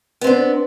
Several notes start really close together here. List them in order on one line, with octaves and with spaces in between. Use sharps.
B3 C4 D4